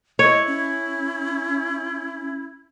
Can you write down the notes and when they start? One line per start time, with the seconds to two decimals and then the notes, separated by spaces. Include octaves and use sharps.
0.19 E4 C#5 D#5
0.47 C#4